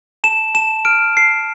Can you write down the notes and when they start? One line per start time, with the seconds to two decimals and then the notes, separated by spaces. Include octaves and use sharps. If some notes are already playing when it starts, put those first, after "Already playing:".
0.24 A5 E7
0.55 A5 E7
0.85 F6 D7
1.16 A5 C7